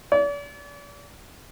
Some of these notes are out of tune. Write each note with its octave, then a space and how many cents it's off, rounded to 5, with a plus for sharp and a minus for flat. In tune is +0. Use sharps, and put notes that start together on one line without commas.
D5 -40